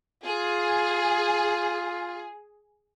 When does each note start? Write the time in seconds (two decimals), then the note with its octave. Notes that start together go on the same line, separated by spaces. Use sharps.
0.24 F4 G#4